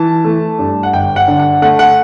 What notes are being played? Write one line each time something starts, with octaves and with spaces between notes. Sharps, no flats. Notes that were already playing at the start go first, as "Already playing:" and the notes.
Already playing: E3 A5
A3
G2
F#5
G1 G5
F#5
D3
F#5
A3 F#5
F#5